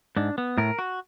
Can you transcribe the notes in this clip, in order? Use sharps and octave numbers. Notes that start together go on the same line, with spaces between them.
G#2 D4
B3
A2 A#4
F#4